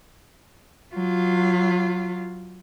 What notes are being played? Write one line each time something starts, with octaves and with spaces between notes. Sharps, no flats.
F#3 F4